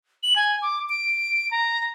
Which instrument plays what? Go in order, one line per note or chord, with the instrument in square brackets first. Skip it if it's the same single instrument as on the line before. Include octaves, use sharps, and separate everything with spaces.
[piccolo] F#7
G#5
D6
D7
A#5